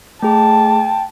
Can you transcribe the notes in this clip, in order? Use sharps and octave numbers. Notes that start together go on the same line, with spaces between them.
A3 G#4 G5 A5